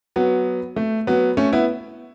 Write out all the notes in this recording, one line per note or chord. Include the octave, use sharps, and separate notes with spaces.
F#3 B3
A3
F#3 B3
A3 C#4
B3 E4